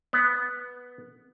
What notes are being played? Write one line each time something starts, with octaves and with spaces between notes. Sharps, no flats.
B3